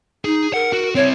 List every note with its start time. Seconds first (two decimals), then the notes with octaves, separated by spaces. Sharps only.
0.25 D#4 G#4
0.54 A#4 F#5
0.73 F#4
0.95 C4 E4 C#5